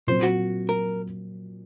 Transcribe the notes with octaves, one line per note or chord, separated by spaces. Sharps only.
A#2 F#3 C4 C5
F#4
A#4